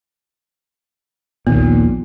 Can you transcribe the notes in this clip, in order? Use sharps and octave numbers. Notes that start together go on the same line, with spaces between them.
A#1 D#2 A#2 B3